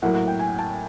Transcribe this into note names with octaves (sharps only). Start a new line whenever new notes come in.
A2 F#3 A#3 F#5
F#5
G5
G#5
A5